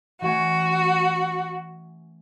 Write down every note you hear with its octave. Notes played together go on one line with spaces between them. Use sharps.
E3 A3 C#4 F#4